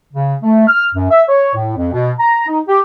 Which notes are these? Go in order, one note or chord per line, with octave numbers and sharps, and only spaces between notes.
C#3
A3
F6
F#2
E5
C#5
A2
F2
B2
A#5
D#4
G4